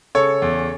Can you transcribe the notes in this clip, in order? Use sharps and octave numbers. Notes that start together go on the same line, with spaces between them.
C#3 A4 C#5
E2